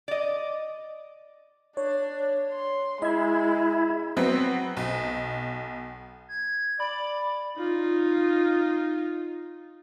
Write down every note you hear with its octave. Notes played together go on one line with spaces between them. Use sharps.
D5 D#5
D4 C#5
C6
G#3 E4 D#5 G#6
F#3 B3 C4
B1
G#6
D5 B5
D#4 F4